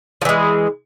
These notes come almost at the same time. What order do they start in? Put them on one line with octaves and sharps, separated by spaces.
F3 E3 G#3